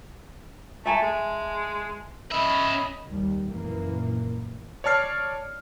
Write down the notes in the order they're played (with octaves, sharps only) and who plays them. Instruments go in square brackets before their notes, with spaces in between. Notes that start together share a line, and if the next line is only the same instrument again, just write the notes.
[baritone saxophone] A3 [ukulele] E5 G#5 A5
[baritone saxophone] G#3
[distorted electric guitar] C#4 E5 [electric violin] D#5 B5
[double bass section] D#2 G3
F#2 A#2 E3 A#3
[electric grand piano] C#5 D5 A5 F6 C7